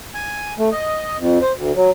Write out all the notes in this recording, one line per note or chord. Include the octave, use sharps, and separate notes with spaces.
G#5
A3
D#5
F2
C5
D2
F#3